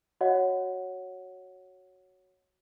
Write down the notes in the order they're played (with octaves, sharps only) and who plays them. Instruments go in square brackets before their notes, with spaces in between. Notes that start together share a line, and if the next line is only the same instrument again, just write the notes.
[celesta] F#4 C#5 D#5 F#5